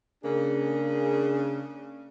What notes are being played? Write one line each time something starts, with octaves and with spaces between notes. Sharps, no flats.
C#3 A#3 D4 G#4